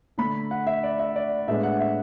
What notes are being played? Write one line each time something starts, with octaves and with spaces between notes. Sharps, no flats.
D3 A3 D4 B5
F#5
E5
D5
E5
D5
A2 G#3 B3 D4 E5
F#5
E5